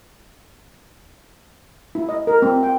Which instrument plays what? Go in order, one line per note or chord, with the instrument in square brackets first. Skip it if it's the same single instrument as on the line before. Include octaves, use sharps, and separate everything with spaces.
[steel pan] E4
D#5
A#4
C4
G5